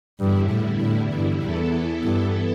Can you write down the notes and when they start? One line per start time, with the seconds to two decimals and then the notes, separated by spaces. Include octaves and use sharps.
0.20 E2 G2 D3 G3 E4
0.50 A2
0.81 A2
1.12 G2
1.42 E2 E3 B3 E4 A4
2.03 G2